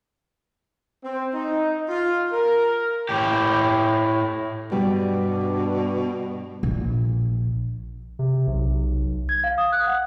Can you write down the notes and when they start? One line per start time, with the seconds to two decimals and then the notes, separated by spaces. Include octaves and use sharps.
1.04 C4
1.35 D#4
1.88 F4
2.33 A#4
3.09 A2 G4
4.72 G2 B2 G3 D4
6.63 A#1
8.19 C3
8.47 B1
9.29 G#6
9.44 F5
9.58 D#6
9.72 F#6
9.87 F#5